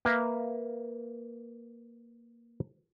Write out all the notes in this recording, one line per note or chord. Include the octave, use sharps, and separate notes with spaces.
A#3 A#4 B4 E5 F5